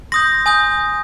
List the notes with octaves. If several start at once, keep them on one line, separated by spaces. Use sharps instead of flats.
C6 D#6 G6 A#6
G#5 D#6 G6